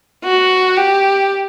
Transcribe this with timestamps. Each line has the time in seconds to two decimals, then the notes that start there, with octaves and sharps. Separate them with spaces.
0.24 F#4
0.77 G4